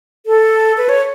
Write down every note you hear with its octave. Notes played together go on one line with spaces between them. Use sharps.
A4
B4
C#5